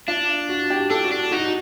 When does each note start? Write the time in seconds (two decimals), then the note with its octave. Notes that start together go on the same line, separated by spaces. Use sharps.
0.08 D4 F4
0.49 F#4
0.70 G4
0.90 D4 A4
1.04 F#4
1.11 D4
1.31 D#4 F#4